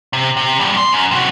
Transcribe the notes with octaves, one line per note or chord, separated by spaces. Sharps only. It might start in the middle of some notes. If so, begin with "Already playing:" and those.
C3
C3
E2 G2
C6
F#2
C3 F#3